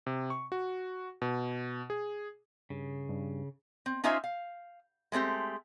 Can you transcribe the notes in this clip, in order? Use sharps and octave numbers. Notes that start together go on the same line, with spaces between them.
C3
C#6
F#4
B2
G#4
G2 C#3
G2
C4
C#4 D#4 F4 C5 E5 G#5
F5
G#3 A3 C4 G4